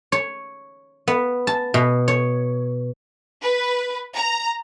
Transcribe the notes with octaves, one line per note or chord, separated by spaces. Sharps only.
C#5
B3
A5
B2
C#5
B4
A#5